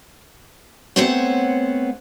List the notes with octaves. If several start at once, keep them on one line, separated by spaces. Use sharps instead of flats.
A3 B3 C4 C5 C#5 F#5